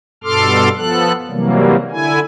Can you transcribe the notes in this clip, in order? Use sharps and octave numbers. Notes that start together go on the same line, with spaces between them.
G2 B2 A4 C6 D6 F6
F3 B3 A4 F#6
C3 E3 F#3 G3 A#3
D3 E4 G#5